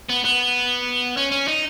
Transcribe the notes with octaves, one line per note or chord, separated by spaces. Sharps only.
B3
B3
C#4
C#4
D#4